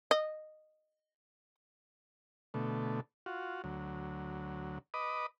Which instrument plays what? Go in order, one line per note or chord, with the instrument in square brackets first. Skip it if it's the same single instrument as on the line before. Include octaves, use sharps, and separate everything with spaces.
[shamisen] D#5
[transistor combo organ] B2 D3 A3
F4 F#4
D2 F#3
B4 D#5 B5 D6 D#6